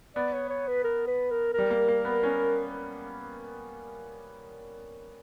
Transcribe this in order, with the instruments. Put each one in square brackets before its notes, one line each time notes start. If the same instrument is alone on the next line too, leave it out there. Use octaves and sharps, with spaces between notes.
[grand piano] B3 [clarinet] D5
[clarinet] C#5
C#5
B4
A#4
B4
A#4
A#4
[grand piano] G3
A#3
A#3
B3
C#4